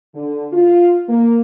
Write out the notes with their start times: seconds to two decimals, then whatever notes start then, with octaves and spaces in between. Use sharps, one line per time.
0.15 D3
0.52 F4
1.09 A#3